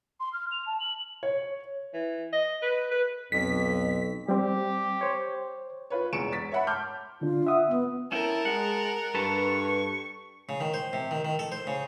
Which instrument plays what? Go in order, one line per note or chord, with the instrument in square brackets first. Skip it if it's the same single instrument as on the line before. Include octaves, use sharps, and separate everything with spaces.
[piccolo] C6
F6
F7
A5
F#7
[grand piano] C#5
[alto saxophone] E3
D#5
B4
B4
[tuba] B1 [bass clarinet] F2 [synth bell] B6
[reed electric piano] G3 C4 [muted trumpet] G4
[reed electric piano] C5 C#5
[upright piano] F4 B4 C#5
E1 E2 C#6 C#7 D7 E7
A6 B6
C#5 E5 F#5 B5
A5 C6 D6 F6 G6
[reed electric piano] D3 D4 [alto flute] F4
[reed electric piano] E5 F#5 D#6
[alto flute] B3
[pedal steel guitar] C#4 E4 G5 [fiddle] A#4 [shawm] A5
[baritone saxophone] G#3 [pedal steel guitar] F#5
[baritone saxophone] G2 [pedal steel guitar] A4 B4 A5 [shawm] C#6
[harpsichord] C#3
D#3
C5
C3
D#3
D#3
A4
C5
C#3